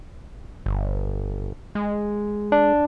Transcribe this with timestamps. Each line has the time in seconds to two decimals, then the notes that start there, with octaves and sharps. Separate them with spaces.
0.66 G1
1.75 G#3
2.52 D4